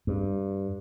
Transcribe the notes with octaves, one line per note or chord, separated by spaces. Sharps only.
G2